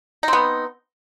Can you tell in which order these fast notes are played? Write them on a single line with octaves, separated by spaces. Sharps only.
D#4 C4 B3